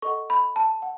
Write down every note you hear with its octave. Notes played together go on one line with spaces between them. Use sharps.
A4 D#5 F#5 C#6
B5
A5
F#5